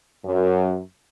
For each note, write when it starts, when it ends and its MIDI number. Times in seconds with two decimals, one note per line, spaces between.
0.25 0.79 42